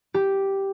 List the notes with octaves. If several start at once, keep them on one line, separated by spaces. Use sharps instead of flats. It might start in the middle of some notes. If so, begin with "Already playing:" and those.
G4